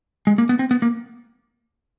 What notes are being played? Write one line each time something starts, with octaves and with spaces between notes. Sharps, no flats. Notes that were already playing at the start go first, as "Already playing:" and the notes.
G#3
A#3
B3
C4
B3
A#3